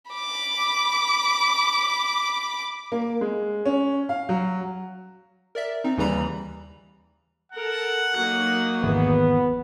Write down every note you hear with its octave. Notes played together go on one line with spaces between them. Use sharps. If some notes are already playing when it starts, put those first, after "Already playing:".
B5 D6
A#3
G#3
C#4
F5
F#3
A#4 D5 E5
C4 D#4
D#2 C#3 E3 G3 A#5 B5
A4 A#4 F#5
F#3 A#3 D#4 F#6
G#1 E2 B3